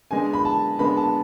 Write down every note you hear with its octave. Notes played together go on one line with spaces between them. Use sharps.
C#3 G#3 B3 D4 G#5
B5
A5
C#3 G#3 B3 D4 B5
A5